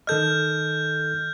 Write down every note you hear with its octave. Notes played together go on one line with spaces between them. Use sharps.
D#3 A4 D#5 F6 G6